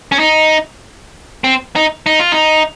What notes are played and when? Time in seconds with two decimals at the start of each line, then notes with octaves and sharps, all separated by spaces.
0.12 C#4
0.19 D#4
1.44 C4
1.76 D#4
2.06 D#4
2.20 F4
2.32 D#4